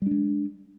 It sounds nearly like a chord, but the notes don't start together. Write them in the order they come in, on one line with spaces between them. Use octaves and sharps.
G3 D4 G#3